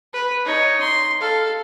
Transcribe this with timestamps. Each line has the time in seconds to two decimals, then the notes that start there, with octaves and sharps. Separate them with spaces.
0.13 B4
0.45 D#4 C#5
0.81 C6
1.21 A4 F5